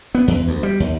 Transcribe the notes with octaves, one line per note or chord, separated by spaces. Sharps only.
B3
E2
D2
G3
D#2